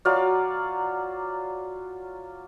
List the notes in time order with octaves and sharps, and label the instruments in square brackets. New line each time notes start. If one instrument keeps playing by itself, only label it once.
[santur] F#3 F4 D5 F5